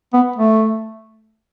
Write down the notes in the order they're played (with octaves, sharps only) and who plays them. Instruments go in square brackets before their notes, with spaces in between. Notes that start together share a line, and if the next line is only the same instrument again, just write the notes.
[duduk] B3
A3